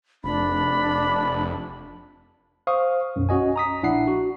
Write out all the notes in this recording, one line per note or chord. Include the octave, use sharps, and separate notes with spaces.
F1 D4 B5
C5 F5 C#6 D#6
B1 F#2
C#4 F#4 D#5 G#5
A#5 D#6 B6
A#1 D4 E4 F#5 C7
F#4